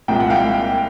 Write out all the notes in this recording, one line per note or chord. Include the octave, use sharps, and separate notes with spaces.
C2 A#2 F3 G#3 G5
F#5
F5 G5